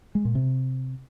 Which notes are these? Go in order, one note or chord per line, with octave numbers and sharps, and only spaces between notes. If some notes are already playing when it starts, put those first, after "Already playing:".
G#3
A#2
C3